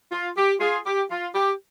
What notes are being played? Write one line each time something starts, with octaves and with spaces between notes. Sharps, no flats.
F4
G4
F4 G#4
G4
F4
G4